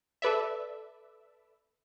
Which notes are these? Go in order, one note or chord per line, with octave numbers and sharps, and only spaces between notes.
A4 B4 D5 E5